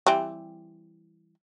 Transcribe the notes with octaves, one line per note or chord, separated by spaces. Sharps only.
E3 G3 C4